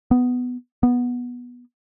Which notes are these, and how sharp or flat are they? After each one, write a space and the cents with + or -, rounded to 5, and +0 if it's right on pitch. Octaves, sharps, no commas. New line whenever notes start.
B3 +10
B3 -10